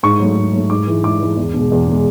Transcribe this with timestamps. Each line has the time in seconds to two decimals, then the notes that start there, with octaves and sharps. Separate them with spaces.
0.03 G#2 C#6
0.20 F#3 A3
0.37 G#2
0.53 F#3 A3
0.70 G#2 D6
0.87 E3 G#3
1.03 G#2 D6
1.20 E3 G#3
1.37 E2
1.54 B2 G#3
1.72 E2
1.87 B2 G#3